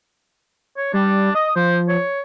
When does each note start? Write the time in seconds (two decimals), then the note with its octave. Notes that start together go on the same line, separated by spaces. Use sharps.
0.77 C#5
0.93 G3 D4
1.35 D#5 D#6
1.56 F3 C5
1.88 C#5